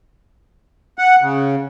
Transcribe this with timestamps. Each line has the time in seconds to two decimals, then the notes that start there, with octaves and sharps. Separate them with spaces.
0.98 F#5
1.22 C#3